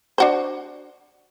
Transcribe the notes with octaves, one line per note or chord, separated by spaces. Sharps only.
D4 F#4 C5